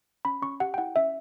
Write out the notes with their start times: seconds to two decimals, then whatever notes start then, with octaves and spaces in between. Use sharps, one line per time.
0.25 C#4 B5
0.42 C#4 C#6
0.60 G4 F#5
0.74 G5
0.78 E4 F#5
0.96 C#4 E5